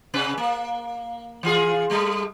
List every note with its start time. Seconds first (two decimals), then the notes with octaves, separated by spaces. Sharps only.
0.14 C3 C#4 B4
0.38 A#3
1.43 E3 F4 G#4
1.90 G3 A3